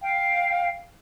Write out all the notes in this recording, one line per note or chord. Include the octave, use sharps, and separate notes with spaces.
F5 G5